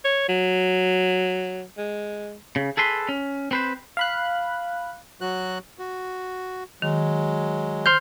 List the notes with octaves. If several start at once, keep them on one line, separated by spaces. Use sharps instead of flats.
C#5
F#3
G#3
C#3
G#4 A4 B4 C6
C#4
C4 B4 C5
F5 B5 F#6
F#3 F#4 F#6
F#4
D#3 F#3 G#3
C5 C6 F6 G6